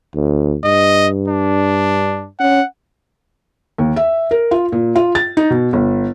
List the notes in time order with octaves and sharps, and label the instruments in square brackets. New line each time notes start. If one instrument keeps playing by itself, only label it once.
[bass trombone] D2
[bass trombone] G2 [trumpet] D#5
[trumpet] D4
[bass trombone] C#4 [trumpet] F#5
[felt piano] D#2
E5
A#4
F4
A#2
F4
A6
D#4
B2
G1